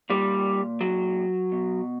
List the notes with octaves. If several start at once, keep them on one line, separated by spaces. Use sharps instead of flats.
A#2 G3
F#3
B2